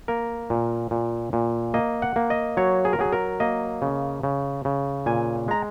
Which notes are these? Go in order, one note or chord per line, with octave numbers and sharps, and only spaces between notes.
A#3 A#4
A#2
A#2
A#2
A#3 D#5
F#5
A#3
D#5
F#3 C#5
G#4
A#4
F#3 G#4
A#4
A#3 D#5
C#3
C#3
C#3
A#2 G#5
G#3 A#5